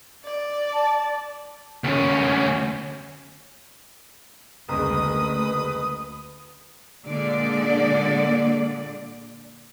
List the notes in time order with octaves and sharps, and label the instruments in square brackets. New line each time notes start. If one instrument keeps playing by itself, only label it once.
[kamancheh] D5
[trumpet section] A5
[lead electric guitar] D2 C#4
[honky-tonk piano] F#1 G#3 [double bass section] D2 [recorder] B4 [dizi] D#6
[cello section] A#2 D3 G#3 D5